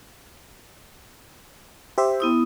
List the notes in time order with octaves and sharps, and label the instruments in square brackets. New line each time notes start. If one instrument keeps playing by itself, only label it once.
[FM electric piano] G4 C5 E5
[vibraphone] B3 E4 D#6